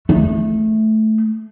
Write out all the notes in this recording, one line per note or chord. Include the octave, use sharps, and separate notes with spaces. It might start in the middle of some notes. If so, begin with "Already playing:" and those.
A3